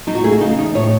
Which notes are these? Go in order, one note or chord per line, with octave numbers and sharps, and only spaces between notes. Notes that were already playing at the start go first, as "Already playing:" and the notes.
F#3 D#4
F#4
A3 G#4
F#4
C#3 D#4
E2 D#4
A2 C#5